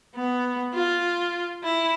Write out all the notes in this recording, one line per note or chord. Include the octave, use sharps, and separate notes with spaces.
B3
F4
E4